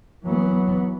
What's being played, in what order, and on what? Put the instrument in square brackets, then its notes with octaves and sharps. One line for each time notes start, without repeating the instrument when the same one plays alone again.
[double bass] E3 B3 [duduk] F#3